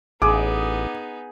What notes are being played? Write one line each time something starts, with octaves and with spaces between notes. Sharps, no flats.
A1 B3 D#4 G#4 D6